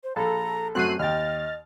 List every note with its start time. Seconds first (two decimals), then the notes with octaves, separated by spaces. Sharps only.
0.04 C5
0.16 A#1 A4 A#5
0.75 F#2 A3 C4 F#4 F#6 C7 D#7
0.99 D#2 D#5 G5 F6 A6